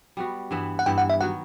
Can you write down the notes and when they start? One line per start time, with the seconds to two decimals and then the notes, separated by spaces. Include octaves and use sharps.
0.17 G3 B3 F#4
0.51 G2 E3 B3 E4
0.79 F#5
0.86 G2 E3 B3 E4 G5
0.98 F#5
1.10 E5
1.20 D#3 F#3 B3 F#4 F#5